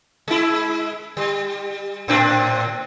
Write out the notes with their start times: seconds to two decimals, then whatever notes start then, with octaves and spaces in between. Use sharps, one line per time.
0.28 G#3 E4
1.17 G3
2.08 A2 C4 D4